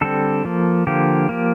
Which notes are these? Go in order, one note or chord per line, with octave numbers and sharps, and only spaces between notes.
D3 G3 C4 A4
F3 A#3
D3 F3 A#3 G4
F3 A#3